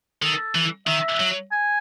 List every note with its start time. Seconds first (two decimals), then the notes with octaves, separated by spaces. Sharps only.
0.22 D#3 A4
0.55 E3
0.87 D#3 E5
1.20 F#3
1.52 G#5